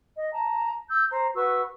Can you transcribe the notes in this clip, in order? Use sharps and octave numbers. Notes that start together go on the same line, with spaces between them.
D#5
A5 A#5
E6 G6
C5 A#5
F#4 B4 C#6 E6